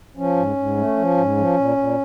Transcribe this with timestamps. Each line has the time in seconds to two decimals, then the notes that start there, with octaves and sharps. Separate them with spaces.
0.17 F3 C#4
0.36 G#2
0.56 G#2
0.77 A3
0.97 F3
1.17 G#2
1.37 F3
1.57 A#2
1.77 A#2